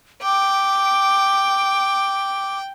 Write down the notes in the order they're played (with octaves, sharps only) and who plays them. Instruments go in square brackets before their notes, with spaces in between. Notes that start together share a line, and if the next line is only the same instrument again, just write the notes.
[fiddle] G5 [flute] D6